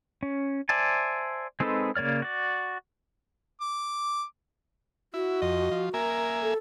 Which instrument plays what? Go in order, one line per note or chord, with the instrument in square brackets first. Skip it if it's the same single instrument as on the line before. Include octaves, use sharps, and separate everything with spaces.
[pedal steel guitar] C#4
C5 D5 E5 G#5 A5
G#3 C4 D#4 A4 B4
C#3 A#3 C#5 D5 F6
F#4 D5
[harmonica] D6
[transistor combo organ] E4 [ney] F#4
[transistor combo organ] F2 [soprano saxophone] D#5
[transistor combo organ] F3
[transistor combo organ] A#3 E5 G#5 [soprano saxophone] A#4
[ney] A4